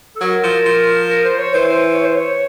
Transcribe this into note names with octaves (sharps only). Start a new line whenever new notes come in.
A4
F#3 A#4
F3
F3
A#4
C5
C#5
E3 C5
C5
C#5
C5
C#5